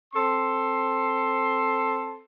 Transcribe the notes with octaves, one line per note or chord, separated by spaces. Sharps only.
C4 A4 C6